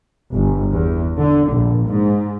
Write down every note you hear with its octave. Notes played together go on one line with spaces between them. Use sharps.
G1
E2
D3
A#1
G#2